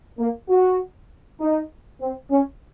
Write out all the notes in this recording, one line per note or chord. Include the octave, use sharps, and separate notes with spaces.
A#3
F#4
D#4
C4
C#4